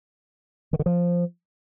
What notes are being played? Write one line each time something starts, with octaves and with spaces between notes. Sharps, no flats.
D#3
D3
F3